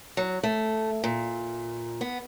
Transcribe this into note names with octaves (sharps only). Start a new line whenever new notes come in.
F#3
A3
A#2
B3